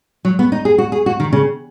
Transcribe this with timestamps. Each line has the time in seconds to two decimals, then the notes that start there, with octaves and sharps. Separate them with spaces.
0.25 F#3
0.39 B3
0.52 D#4
0.65 G#4
0.78 F#4
0.92 G#4
1.06 F#4
1.20 D#3
1.33 C#3